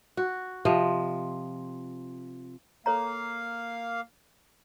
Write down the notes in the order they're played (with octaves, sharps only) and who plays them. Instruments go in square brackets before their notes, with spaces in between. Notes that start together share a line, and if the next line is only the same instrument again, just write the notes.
[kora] F#4
C3 F3 D#5
[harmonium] A#3 F5 [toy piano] A4 C#5 A#5